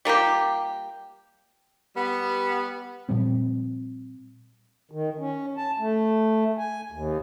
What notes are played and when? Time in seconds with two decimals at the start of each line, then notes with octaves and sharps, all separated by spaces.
0.05 G3 A#3 F4 G4
1.96 G3 B3
3.09 A#2 F3 G3 C4
4.91 D#3
5.19 C#4
5.57 A5
5.79 A3
6.58 G#5
6.92 D#2